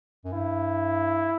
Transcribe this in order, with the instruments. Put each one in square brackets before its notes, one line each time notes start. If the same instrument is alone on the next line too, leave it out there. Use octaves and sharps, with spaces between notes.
[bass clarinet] F#2
[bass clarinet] G2 [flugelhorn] E4